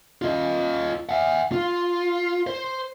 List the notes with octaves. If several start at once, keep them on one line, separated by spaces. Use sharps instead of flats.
F4 D#5
E5 F#5
F4
C5